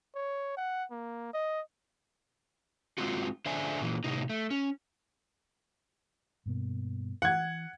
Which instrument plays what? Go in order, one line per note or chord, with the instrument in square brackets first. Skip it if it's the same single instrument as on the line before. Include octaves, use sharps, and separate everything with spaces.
[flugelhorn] C#5
F#5
A#3
D#5
[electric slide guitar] G#3 C4 F4 F#4
D3 C5 D5 E5 G#5
A#2 E3 A#3
A2 C3 D#4
A3
C#4
[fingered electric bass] G2 B2 A#3
[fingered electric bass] E3 [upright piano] F#5 G#6